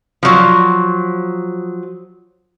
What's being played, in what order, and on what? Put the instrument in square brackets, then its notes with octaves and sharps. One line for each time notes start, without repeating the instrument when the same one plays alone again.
[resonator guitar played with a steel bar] F3 F#3